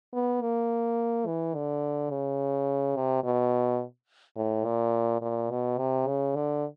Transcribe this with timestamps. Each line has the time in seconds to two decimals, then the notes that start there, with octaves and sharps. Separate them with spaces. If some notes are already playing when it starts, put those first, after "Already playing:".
0.13 B3
0.42 A#3
1.27 E3
1.55 D3
2.10 C#3
2.96 C3
3.23 B2
4.36 A2
4.65 A#2
5.22 A#2
5.51 B2
5.78 C3
6.07 C#3
6.35 D3